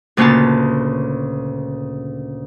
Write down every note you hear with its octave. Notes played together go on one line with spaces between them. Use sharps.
D2 A#2 C#3 B4 C#5 A5